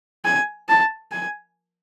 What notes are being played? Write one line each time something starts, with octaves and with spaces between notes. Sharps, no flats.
G#5
A5
G#5